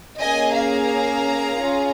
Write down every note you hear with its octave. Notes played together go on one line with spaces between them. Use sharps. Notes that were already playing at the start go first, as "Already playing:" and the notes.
A#3 C#4 G#4 D#5 G#5
F5 A#5
C#4 F4 G#4